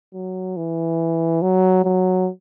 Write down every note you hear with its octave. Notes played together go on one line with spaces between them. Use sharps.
F#3
E3
F#3
F#3